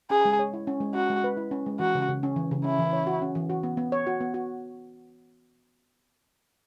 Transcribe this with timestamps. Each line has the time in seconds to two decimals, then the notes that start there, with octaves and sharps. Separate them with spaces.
0.10 C#4 G#4
0.25 G#3
0.39 C#5
0.53 E4
0.67 C#4
0.80 G#3
0.95 C#4 F#4
1.10 G#3
1.24 B4
1.37 E4
1.51 C#4
1.66 G#3
1.79 E3 F#4
1.95 C#3
2.09 C#3
2.23 C#4
2.36 E3
2.51 C#3
2.64 C#4 E4
2.79 E3
2.93 C#5
3.07 F#4
3.22 C#4
3.35 E3
3.50 F#4
3.63 B3
3.77 B3
3.92 C#5
4.07 F#4
4.20 B3
4.34 F#4